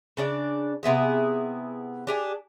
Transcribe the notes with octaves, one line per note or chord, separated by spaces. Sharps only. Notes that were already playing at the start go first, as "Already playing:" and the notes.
C#3 D4 D5
C3 B3 E4 G#4
D4 G4 G#4